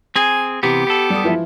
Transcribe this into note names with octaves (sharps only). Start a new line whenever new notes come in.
C4 G#4 G#5
C3 E3 B3 G4
B3 A4
G3 D#6
E3 F3 E4